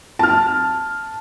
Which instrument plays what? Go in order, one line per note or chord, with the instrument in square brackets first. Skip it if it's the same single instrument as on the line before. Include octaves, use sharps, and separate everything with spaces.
[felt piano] A5 F6